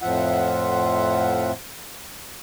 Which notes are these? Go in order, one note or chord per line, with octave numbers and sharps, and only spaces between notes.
F2 A2 F3 F4 E5 F#5